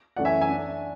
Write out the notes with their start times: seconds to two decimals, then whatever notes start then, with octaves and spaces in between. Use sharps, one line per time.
0.16 F#2 E3 A3 D5 F#5
0.25 E5 G#5
0.41 E5 G#5
0.49 D4